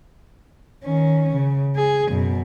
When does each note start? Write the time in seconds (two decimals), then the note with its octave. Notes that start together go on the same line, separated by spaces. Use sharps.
0.84 D#3 C#4
1.36 C#3
1.75 G#4
2.09 F#2 B2